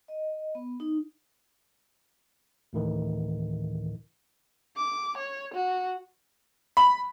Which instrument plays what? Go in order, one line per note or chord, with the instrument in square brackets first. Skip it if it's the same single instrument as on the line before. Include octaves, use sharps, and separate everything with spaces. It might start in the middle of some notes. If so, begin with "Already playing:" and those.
[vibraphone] D#5
B3
D#4
[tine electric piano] D2 A2 D#3 E3
[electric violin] D6
C#5
F#4
[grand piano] B5